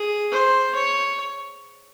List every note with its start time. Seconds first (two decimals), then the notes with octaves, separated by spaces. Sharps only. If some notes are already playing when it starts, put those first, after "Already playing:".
Already playing: G#4
0.32 C5
0.75 C#5